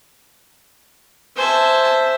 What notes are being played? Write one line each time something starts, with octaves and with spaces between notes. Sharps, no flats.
C5 E5 G#5 A5